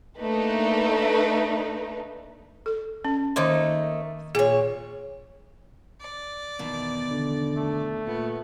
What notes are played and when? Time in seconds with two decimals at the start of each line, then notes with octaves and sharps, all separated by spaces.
0.19 A3 A#3 D4 D#4 B4
2.66 A4
3.05 C#4
3.36 D#3 A3 A#3 D#4 C6
4.35 A#2 G#4 C#5
6.01 D5
6.59 E2 B2 D#3
7.11 D3
7.56 A3
8.06 A#2 B3